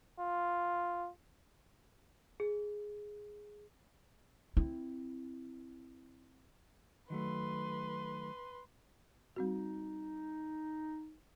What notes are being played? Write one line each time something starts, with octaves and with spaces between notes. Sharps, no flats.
F4
G#4
C4 E4
D#3 F#3 A3 B4 C6
G3 C4 D#4 F#4